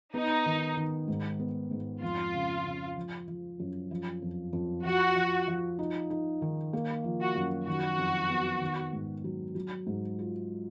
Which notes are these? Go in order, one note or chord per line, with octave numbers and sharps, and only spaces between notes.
B3 D#4
D#3
D#3
G#2
B3
G#2
F2 F4
C#3
C#3
F3
F3
F#2
F3
F2
F2
F3 F#4
F3
F3
D#4
D#4
D#3
A#3
F3
F#4
F#2
D#3 F#4
F2
B3
D#3
G#2
F#3
F#3
G#2
F4